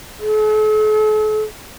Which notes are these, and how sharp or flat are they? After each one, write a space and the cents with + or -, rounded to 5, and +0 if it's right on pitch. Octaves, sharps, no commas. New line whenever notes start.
A4 -45